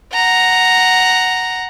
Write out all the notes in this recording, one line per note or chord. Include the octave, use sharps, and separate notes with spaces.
F#5 A#5